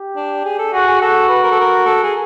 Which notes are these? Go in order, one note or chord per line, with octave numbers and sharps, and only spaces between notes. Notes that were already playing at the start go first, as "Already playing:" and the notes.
Already playing: G4
D4
G#4
A4
F#4 G#4
G#4
F#4 A4
B4
A#4
A4
A#4
A4
G#4